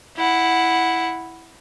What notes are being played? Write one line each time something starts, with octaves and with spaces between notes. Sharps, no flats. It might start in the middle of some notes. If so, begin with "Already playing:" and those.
E4 F#5